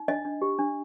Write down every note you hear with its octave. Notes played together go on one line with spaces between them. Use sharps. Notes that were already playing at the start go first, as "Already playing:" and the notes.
Already playing: D#4
D4 D#5
D4
G4
D4